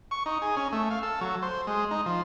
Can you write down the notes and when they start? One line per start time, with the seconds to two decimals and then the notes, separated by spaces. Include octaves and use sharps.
0.11 C#6
0.26 D#4
0.42 G#4
0.56 C#4
0.72 A3
0.91 F5
1.03 A4
1.21 F#3
1.42 C5
1.67 G#3
1.91 D#4
2.06 F3